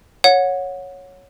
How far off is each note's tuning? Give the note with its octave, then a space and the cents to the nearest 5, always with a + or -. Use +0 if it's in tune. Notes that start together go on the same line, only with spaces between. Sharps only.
C#5 +0 F#5 -25